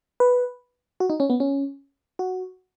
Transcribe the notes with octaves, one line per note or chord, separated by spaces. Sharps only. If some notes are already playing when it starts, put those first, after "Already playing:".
B4
F#4
D#4
C#4
B3
C#4
F#4